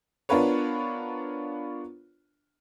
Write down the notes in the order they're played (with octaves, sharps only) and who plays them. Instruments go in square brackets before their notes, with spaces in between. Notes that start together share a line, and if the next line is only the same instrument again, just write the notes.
[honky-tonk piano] B3 D4 F4 A#4 B4 C#5